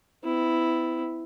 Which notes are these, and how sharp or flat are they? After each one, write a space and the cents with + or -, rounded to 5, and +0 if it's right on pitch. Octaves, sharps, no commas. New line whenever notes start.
B3 +45 E4 +0